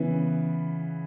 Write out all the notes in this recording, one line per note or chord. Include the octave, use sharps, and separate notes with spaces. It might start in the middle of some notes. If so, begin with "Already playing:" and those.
Already playing: C#3 E3 B3